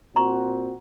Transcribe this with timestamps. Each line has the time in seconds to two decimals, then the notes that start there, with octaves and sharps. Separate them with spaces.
0.16 A#2 C4 F#4 A#5 C6 C#6